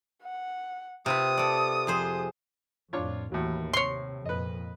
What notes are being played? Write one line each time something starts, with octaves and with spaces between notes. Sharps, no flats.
F#5
C3 F4 B4 D#6
A4 D5
F2 G#4 C5
F2 A2 D4 F4 C#5
D#2 A2 E3 F#3
C3 C#5 C6
F2 A#2 B4 D#5